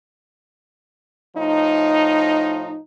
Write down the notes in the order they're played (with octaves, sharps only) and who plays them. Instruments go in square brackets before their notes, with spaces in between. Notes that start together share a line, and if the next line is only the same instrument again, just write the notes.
[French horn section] A2 F3 D#4